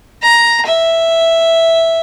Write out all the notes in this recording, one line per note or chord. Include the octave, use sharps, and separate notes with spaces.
A#5
E5